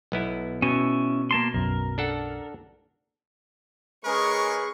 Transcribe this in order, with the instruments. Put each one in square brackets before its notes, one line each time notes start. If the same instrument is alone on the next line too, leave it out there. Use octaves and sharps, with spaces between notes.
[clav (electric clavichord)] B1 B3 E4
[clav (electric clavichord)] B2 [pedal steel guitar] C#4 E4
[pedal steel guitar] A#3 A5 C6
[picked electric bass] B1 F#2 [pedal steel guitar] A#4
[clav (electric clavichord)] D4 A4 F#5
[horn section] G#3 C#4 A#4 [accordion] G#4 [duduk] B4 [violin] C#6